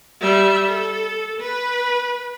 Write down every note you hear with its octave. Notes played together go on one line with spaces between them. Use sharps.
G3 E5
A4
B4